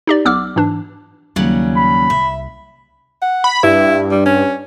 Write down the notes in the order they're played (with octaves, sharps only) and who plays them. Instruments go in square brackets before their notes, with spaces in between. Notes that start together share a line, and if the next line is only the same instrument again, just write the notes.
[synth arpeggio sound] D#4 G4 D5
B1 B3 D6 E6 F6
G#2 E3 D4
[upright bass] D#2 [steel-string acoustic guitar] C#3 F#3 G3
[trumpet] B5
[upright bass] C2 [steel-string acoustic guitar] E5
[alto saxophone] F#5
[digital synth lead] B5
[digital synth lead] G2 [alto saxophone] E4
[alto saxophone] G3
C#4